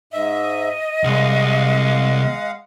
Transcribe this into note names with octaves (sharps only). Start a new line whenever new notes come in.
G#2 D#5 E5
C2 G#3 F5 F#5